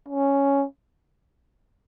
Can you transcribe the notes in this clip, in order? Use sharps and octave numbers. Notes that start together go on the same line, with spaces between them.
C#4